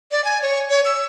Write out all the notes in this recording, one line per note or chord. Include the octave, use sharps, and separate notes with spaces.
D5
G#5
C#5
C#5
E6